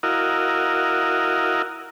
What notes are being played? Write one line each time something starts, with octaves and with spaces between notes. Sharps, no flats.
E4 F#4 A#4 D#5 F5